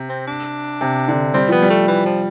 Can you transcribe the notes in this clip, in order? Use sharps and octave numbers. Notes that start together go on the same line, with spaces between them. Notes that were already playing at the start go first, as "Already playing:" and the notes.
Already playing: C3
C4
D4
C3
D3
G3 C4
F3 B3
G3
A3
E3
F3